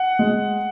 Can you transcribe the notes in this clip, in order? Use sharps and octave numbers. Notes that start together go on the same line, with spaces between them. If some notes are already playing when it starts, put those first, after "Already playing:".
Already playing: F#5
G#3